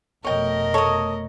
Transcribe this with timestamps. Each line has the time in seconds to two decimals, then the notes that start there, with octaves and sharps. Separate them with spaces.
0.24 F1 B2 A3 A#4 C#5 D#5 G5
0.74 A4 C#5 D#6